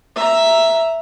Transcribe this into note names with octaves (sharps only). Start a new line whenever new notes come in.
E5 A#5